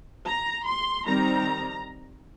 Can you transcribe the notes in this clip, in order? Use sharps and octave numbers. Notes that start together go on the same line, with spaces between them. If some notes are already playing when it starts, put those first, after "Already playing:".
A#5
C6
D#3 G3 C4 A#5